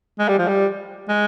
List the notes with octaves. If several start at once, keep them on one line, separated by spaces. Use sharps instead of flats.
G#3
G3
F3
G3
G#3